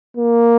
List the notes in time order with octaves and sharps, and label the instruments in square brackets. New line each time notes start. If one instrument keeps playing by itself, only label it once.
[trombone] A#3